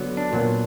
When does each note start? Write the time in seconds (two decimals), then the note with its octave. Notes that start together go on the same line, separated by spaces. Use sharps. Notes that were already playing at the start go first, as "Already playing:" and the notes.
Already playing: D3 F#3 B3
0.17 D4
0.33 A#2 F#3 B3